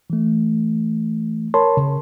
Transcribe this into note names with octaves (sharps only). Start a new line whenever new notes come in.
E3 A3
A#4 C#5 A5 B5 C6
C#3